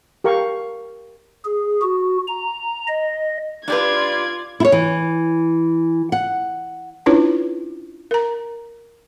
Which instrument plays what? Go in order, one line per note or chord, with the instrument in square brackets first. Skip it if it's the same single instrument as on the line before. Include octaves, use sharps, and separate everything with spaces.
[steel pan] G4 A#4 F5 C#6
[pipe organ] G#4
F#4
A#5
D#5
[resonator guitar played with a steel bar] D4 G4 B4 [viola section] F4 D5 [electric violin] G#6
[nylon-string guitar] E4 C#5
E3
F#5
[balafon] C#4 D4 E4 F4 B4 C#5
A#4 A#5